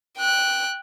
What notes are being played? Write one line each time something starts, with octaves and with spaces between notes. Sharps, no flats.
G5 F#6